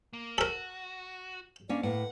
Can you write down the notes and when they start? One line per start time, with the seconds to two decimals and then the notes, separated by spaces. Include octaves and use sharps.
0.13 A#3
0.38 F#4 A4 A#4
1.69 A#3 C#4 D4 D5
1.83 A2 A#3 B4 F#5